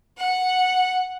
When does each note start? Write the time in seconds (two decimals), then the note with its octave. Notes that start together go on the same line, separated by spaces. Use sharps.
0.17 F#5